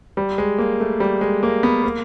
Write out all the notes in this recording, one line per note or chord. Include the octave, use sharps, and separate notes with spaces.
G3
G#3
A#3
A3
G3
G#3
A#3
B3
A#3